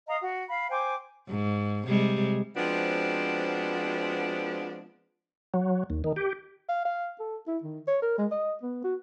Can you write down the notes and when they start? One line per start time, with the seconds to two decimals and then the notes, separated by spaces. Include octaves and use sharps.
0.08 D#5 F5 A#5 D#6
0.22 F#4
0.49 F5 B5
0.70 C5 G5 G#5 D6
1.29 G#2
1.87 C3 G3 G#3
2.56 F3 G#3 B3 C4 D4 F#4
5.54 F#3
5.90 D#2
6.04 D#3
6.16 G4
6.69 F5
6.85 F5
7.20 A4
7.47 E4
7.63 D#3
7.88 C#5
8.02 A#4
8.18 G#3
8.31 D#5
8.62 B3
8.84 F#4